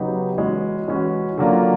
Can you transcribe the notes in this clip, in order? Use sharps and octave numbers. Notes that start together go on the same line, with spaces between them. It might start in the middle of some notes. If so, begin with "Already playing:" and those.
Already playing: C#3 F#3 B3 D#4 G4
E3 G#3 C#4 F#4
E3 G#3 C#4 F#4
D3 F#3 A#3 D4 F4